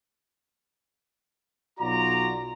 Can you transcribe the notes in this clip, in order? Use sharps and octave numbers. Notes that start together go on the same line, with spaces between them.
B1 F4 F#4 D5 A#5